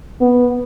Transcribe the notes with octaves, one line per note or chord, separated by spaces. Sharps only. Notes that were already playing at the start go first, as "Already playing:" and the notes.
B3